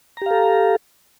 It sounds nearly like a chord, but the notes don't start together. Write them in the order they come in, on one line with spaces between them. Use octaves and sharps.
A#5 G4 F5 A4